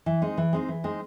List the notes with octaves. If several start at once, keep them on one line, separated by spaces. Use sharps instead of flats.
E3
G#3 C4 D#4
E3
G#3 C4 D#4
E3
G#3 C4 D#4